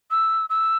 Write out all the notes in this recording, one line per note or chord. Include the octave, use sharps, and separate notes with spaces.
E6
E6